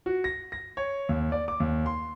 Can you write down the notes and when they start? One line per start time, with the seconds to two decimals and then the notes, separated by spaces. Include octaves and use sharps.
0.06 F#4
0.24 A#6
0.52 A#6
0.77 C#5
1.09 D#2
1.32 D5
1.48 D6
1.60 D#2
1.86 C6